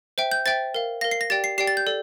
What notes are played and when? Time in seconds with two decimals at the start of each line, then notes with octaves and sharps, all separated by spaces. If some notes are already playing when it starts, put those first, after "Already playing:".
0.18 C5 E5 G5
0.31 G6
0.46 C5 E5 G5 A6
0.75 A#4 F5
1.01 A#4 F5 A#6
1.11 C7
1.21 A#6
1.30 G4 D5 G5 A6
1.44 C7
1.58 G4 D5 G5 C7
1.67 A6
1.77 G6
1.87 A4 D5